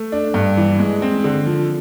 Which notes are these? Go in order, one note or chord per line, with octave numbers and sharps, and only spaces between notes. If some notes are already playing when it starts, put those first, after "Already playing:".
Already playing: A3
D4
G2
E3
G#3
C4
D3
F3